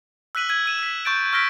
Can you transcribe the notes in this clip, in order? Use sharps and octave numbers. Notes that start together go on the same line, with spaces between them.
E6 F#6 B6 D#7 F#7
E6 G#6 D#7
E6 D#7 E7
E6 B6
C#6 G6 A6 D7
C#6 E6 F6 A#6 B6 D7